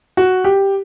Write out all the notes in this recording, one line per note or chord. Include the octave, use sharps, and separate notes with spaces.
F#4
G4